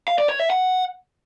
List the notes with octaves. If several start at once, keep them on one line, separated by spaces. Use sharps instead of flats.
F5
D5
C#5
E5
F#5